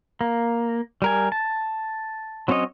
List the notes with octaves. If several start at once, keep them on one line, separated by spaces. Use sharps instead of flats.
A#3
G3 A#4 G#5
A5
F#3 C4 C#4 C#5 D#5